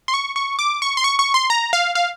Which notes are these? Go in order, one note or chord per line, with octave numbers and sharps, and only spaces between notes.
C6
C#6
C#6
D6
C#6
C6
C#6
C#6
C6
A#5
F5
F5